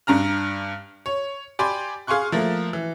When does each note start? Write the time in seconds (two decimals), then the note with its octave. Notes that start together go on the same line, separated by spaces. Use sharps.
0.07 G2 D4 A#5 F6
1.06 C#5
1.59 G4 D5 G#5 B5 C6
2.07 G#4 F5 G#5 C6 C#6 F#6
2.32 F3 A3 A#3
2.73 E3